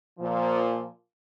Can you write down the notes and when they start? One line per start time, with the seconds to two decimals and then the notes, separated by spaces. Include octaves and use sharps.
0.18 A#2 F3